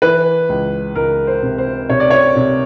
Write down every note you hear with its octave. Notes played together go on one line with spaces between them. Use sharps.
E3 B4
C#2
C#2 A#4
C5
C3
C5
C3 C#5
D5
C#5
C3